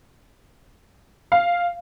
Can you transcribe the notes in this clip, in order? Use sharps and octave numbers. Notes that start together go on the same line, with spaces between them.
F5